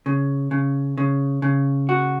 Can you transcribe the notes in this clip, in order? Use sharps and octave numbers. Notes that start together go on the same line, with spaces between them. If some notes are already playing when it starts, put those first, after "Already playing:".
C#3
C#3
C#3
C#3
F#4